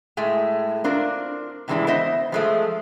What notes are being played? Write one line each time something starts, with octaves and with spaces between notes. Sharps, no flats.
A2 G#3 A3
C4 D4 F4 A#4
A2 C3 E3 G#3 D4 E4
B3 C5 D#5 E5
F3 G#3 A3